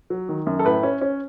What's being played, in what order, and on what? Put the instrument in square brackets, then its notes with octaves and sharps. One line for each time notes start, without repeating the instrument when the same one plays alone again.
[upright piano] F#3
D#3
F#2
A4
A2 B4
C#4
C#4